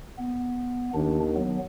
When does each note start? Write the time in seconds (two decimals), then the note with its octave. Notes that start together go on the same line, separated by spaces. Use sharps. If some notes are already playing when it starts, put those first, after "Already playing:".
0.18 B3
0.94 D#2 D#3 D4
1.35 F#3 B3